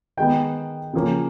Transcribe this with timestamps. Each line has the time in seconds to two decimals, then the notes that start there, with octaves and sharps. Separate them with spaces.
0.17 D#3 G#3 B3 G5
0.93 C#3 F3 A#3 C#4